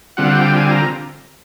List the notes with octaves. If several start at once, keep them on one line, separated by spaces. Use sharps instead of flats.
D3 G3 C4 F4 F#5
G5
G#5
A#5